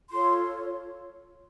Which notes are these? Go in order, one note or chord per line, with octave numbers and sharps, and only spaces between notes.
F4 A4 C#5 C6